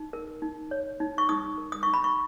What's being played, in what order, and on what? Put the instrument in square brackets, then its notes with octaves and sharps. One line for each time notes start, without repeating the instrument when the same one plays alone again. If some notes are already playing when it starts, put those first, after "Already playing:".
Already playing: [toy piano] D#4
A#4
D#4
C#5
D#4
C#6
D#4 D#6
A#4
D#6
D#4 C#6
B5
C#6